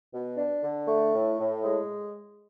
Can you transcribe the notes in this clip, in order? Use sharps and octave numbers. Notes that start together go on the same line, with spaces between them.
B2
D4
D3
A3
A2
A2
G#3